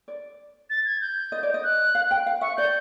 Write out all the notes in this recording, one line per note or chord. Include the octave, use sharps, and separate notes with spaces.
D5
A6
G#6
G6
D#5
D5
D#5
F#6
F5
G5
F5
E5 C#6
D5 G6